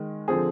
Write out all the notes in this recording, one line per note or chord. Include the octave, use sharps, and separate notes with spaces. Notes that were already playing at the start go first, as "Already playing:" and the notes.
Already playing: D#3 G#3
D3 F3 C4 G#4